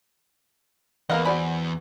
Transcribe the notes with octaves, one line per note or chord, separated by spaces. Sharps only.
E2 A#3 B3 A#4 D#5 F5 F#5
F#4 C5 D5 G#5 B5